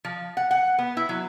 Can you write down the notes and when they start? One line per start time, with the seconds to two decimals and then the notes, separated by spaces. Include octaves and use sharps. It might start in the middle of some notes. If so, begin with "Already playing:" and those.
0.05 F3
0.37 F#5
0.51 F#5
0.78 B3
0.97 E4
1.09 F#3